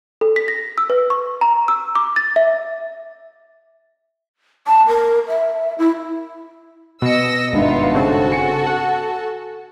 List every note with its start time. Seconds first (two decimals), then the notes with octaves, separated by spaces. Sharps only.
0.21 A4
0.36 B6
0.48 A#6
0.78 E6
0.90 B4
1.10 C#6
1.41 A#5
1.68 E6
1.95 D6
2.16 A6
2.36 E5
4.67 A5
4.87 A#4
5.28 E5
5.78 E4
7.02 B2 D#5 E6 A#6 C#7
7.52 G#1 G2 B3 D#4 F4 E5
7.95 C#3 C4 F#4 A4 A5
8.30 G#5 C#7
8.66 F#5